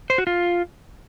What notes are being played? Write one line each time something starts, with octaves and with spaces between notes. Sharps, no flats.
C5
F#4
F4